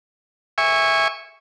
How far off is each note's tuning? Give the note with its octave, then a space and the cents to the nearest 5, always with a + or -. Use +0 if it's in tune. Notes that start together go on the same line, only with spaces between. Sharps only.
E5 -5 G#5 -25 C#6 +0